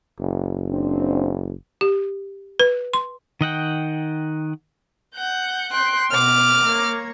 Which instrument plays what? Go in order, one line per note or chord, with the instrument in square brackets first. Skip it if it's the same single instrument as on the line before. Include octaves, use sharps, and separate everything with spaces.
[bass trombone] F#1
[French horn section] C4 D4
[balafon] G4
B4
C6
[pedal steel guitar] D#3 D#5 F#5 G5
[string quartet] F#5 G6
[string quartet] G5 C6 [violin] F#6
[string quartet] B2 [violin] D6 F6
[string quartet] A#3 C#5